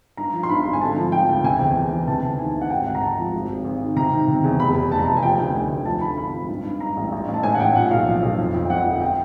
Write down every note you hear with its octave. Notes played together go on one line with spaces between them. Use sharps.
G2 A#5
F3
C6
G2 B5
G#1
G#5
D3 A5
F3
F3 G5
D2
C3 G#5
E2 G5
E3
E3
C3 A5
D2
D#3 G#5
D2
F#5
G#1 G5
G#1 F#5
A#5
G#1 A5
F3
G#1
G#1
G#1
D#3
C3 A#5
D#3
C3
E2
F1 B5
F1
F1 A5
A#5
F1 A5
G#5
F3 G5
D2 G5
D2 G#5
D2
F3 A5
D3 B5
G#1 B5
F3
G2
G2
G2 A#5
A1
A1
A1
A5
A2 G#5
F#5
A1 G5
A#2 F#5
B1 F5
F3
B1
F2
F2
G5
F2 F#5
G1
G5